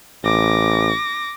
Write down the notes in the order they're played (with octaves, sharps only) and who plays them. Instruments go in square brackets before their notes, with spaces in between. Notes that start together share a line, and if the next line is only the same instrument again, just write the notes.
[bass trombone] A1 [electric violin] D6 A#6